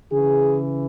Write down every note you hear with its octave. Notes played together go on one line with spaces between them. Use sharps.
C#3 E3 G#4